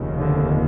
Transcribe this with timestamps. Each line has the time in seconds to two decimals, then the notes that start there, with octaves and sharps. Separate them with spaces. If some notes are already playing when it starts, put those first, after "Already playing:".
Already playing: F1 D#2 C#3
0.22 D3